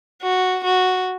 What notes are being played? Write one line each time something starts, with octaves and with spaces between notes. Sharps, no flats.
F#4
F#4